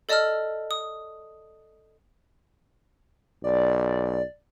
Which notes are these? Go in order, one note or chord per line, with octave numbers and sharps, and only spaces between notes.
A4 D5 D#5 A5 E6 F6
D#6
B1 D5